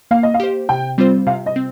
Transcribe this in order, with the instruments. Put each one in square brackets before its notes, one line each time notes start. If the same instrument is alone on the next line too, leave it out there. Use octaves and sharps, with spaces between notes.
[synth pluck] A#3 [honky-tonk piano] F5
[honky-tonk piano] D#5
F5
[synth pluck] G4 C5
[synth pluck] C3 [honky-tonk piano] G5
[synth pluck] G3 C4 F4 C5
[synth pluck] C3 [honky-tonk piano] F5
[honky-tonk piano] D#5
[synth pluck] C4